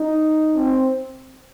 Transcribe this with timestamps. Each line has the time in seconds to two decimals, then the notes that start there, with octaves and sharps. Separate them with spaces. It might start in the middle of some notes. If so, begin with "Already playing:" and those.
Already playing: D#4
0.56 C4